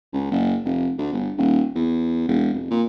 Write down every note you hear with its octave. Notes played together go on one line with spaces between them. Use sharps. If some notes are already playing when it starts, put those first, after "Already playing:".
C#2
F#1
F1
D2
G1
D#1
E2
E1
F1
A#2